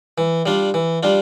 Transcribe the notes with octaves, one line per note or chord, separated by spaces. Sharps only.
E3
G3 D4 F4
E3
G3 D4 F4